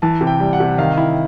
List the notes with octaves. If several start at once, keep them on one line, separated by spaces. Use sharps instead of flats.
E3 A5
C3
G5
G3
F#5
C3
D#3 F5
E4